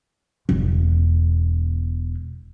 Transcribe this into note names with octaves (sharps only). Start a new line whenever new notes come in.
E1 E2